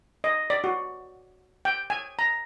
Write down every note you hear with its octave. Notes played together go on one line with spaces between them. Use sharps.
D#5
D5
F#4
G5
G#5
A#5